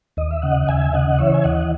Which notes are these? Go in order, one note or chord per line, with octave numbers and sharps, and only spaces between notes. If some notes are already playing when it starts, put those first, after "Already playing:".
D#2 D#5
E5
C#3 D#5 F#5
D#2 E5 G#5
C#3 D#5 F#5
E3 C#5 E5
G#5
D#2 D#5 F#5